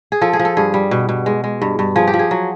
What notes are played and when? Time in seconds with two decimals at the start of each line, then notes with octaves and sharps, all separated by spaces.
0.12 G#4
0.21 F3 A4
0.33 G#4
0.39 F3
0.45 A4
0.57 G2 G#4
0.74 G3
0.91 B2
1.09 B2
1.26 G#3
1.44 G#3
1.61 G2
1.79 G2
1.96 F3 G#4
2.07 G4
2.14 F3
2.19 G#4
2.31 F#3